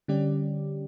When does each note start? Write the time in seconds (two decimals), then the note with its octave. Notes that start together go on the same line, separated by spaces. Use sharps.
0.08 D3 G3 C#4 G4 D5